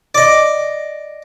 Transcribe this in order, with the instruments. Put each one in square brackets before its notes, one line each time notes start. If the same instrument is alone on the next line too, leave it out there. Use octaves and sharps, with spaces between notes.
[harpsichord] D5 D#5